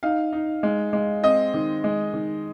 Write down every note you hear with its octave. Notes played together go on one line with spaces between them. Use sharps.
D#4 F5
D#4
G#3
G#3
C4 D#5
D#3
G#3
D#3